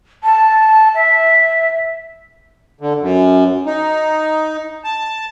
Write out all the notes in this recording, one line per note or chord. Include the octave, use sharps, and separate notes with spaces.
A5
E5
D3
F#2
D#4
A5